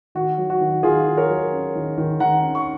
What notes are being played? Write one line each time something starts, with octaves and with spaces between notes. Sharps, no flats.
D#3 F#4
F#3
F#4
D#3
D#3 F4 G#4
D#3
A#4 C#5
F#3
C#4
D#3
D#3
D#3 F#5 A#5
C#4
C#6